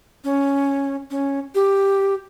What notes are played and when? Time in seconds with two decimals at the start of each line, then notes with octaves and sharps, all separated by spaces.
0.24 C#4
1.11 C#4
1.55 G4